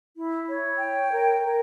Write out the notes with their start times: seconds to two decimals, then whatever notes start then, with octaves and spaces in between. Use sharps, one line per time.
0.15 E4
0.47 C#5
0.78 G5
1.10 A#4
1.42 A#4